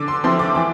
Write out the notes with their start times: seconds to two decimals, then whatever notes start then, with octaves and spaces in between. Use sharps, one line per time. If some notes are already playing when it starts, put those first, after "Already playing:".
Already playing: D3 D6
0.08 C6
0.24 F3 C4 E4 C6
0.39 D6
0.55 E3 D6